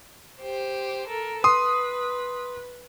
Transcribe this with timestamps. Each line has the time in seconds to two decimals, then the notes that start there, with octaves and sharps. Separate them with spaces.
0.40 G4 C5
1.07 A4 A#4
1.44 B4 C6 D#6